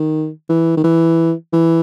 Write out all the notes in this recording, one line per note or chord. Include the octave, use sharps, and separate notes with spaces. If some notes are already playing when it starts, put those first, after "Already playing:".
Already playing: D#3
E3
D#3
E3
E3